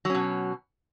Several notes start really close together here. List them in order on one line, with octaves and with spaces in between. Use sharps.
F#3 C#4 B2